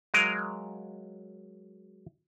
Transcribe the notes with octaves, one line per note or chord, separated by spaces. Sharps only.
F#3 G#3 A#4 D#5 F5